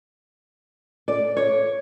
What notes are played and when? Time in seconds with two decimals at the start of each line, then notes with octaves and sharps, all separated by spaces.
1.08 D5
1.37 C#5